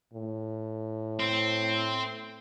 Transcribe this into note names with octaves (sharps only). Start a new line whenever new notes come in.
A2
C4